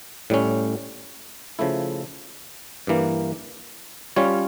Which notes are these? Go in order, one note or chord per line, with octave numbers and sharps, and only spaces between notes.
A2 G3 C#4
C#3 F3 A3 E4
G2 E3 A#3
G3 C#4 F4 C#5